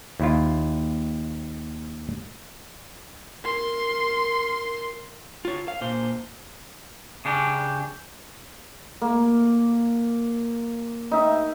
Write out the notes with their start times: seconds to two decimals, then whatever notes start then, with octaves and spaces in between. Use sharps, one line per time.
0.20 D#2 E4 F4
3.45 A#4 C6
5.45 F4 C#5
5.68 F5
5.81 A#2 C5
7.25 C#3 D4 G4
9.02 A#3
11.12 D#4 E5